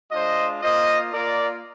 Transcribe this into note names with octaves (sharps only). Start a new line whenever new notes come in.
G#3 D4 F4 C5 D#5
A#3 F4 C5 D#5
A#3 F4 A#4 D5